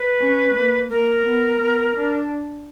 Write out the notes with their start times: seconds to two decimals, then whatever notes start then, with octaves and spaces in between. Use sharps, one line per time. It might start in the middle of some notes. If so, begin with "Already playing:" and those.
Already playing: B4
0.20 C#4
0.55 A#3
0.90 A#3 A#4
1.24 B3
1.60 B3
1.95 D4